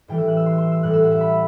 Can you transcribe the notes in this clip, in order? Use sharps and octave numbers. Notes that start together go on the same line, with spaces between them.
A2 E3 G3 G5
E6
F#6
E6
C6
C6
E6
A2 G3 F#6
E6
F#5
E5
B5